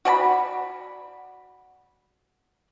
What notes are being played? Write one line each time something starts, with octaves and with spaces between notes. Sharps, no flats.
F#4 D5 A5 B5